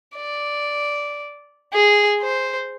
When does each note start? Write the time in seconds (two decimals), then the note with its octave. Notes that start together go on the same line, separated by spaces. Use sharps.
0.16 D5
1.73 G#4
2.21 C5